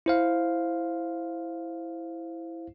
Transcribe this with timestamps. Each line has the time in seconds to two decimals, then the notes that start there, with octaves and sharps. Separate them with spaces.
0.06 E4 C5 F5